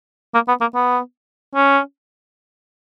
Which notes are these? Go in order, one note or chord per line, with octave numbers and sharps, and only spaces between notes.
A#3
B3
A#3
B3
C#4